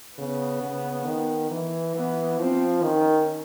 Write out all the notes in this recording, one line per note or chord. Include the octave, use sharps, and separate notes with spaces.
C#3 B3
C#3
D#3
E3
E3 B3
F3 C4
D#3 C#4